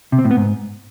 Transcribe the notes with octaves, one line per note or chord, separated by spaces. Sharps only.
C3
C4
A2
B3
G#2